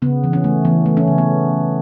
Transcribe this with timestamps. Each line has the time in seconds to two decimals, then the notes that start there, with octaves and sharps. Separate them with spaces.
0.02 C#3 B3
0.24 E3
0.33 C#4
0.44 A3
0.65 E3 B3
0.86 A3
0.97 C#4
1.08 C#3
1.18 B3